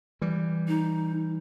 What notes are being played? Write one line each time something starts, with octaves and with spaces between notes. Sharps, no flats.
E3 G3
D#4